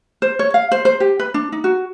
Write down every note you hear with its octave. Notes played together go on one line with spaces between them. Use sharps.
C5
C#5
F5
C5
C5
G4
B4
D4
D#4
F#4